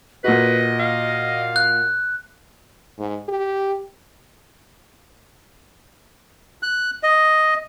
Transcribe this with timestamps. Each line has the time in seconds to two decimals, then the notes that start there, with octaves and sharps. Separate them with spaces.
0.24 A#2 F#4 B4 D#5
0.80 F5
1.56 F#6
2.98 G#2
3.28 G4
6.63 F#6
7.03 D#5